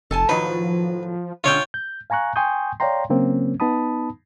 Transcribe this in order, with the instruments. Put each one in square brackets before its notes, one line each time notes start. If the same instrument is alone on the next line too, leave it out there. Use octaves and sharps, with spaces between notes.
[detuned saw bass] F1 [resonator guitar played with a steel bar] A4 G#5 A5
[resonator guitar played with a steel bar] A2 D#3 F#3 [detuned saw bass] F3 [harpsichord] B4
[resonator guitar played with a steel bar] D3 G#3 C#4 [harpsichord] F4 C#5 G5
[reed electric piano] G6
F5 G#5 A#5 C#6 F#6
G5 G#5 C6 C#6 D#6 G6
C#5 D5 F5 G5 A#5 C6
C#3 F#3 A#3 C4 C#4
B3 D#4 A5 B5 D#6